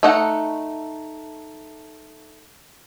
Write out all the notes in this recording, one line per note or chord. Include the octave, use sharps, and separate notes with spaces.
A3 D#4 F#5